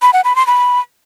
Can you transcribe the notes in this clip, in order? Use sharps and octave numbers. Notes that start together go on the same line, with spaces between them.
B5
F#5
B5
C6
B5